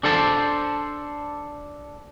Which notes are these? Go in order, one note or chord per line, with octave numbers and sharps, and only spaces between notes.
D4 A4 C5 A5